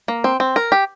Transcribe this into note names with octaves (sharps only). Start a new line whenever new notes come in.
A#3
C4
C4
A#4
G4